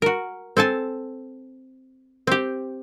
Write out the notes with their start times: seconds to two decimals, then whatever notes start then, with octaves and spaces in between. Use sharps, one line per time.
0.02 F#4 A#4
0.57 C4 A4 G#5 A5
2.27 C4 G4